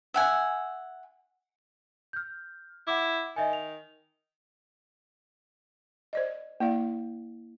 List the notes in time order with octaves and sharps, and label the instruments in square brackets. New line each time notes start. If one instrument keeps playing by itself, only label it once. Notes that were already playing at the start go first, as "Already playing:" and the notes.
[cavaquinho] E5 F#5 G#5
[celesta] F6 G6
[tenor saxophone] E4 [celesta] F#5 D6
[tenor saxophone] D#3 [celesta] D#5 E5 G#5
[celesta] F7
[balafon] C5 D5 D#5
A#3 E4 D5 F5